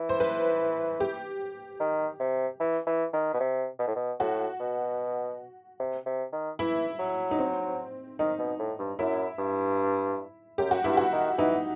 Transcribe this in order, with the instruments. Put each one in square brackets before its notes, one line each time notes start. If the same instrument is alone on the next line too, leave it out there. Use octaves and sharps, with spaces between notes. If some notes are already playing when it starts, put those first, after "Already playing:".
Already playing: [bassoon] E3
[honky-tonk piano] C5
B4
G4
[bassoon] D#3
C3
E3
E3
D#3
B2
C3
B2
A2
B2
[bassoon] A2 [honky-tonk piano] F#4
[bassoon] B2
C3
C3
D#3
[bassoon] E3 [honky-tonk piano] E4
[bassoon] F#3
[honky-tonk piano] D#4
C4
[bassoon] D#3 [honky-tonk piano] D#4
[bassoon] B2
A2
G2
[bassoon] F#2 [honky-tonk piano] E4
[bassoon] G2
[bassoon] F#2 [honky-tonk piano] G4
[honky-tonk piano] F#4
[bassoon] G2 [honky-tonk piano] E4
[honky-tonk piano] F#4
[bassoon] D#3
[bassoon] E3 [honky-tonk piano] D#4